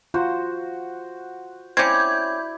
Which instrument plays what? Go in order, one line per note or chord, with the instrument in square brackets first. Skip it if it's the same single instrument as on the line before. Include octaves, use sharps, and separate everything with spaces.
[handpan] F4 [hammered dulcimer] F#4 C5
[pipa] C4 C#4 [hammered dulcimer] E4 D5 E5 [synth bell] G6 G#6